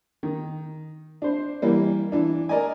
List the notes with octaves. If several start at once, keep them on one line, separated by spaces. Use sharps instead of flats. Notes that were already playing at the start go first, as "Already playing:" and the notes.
D#3
D4 C5
E3 G3 A#3
E3 D4
A#4 D5 D#5 G#5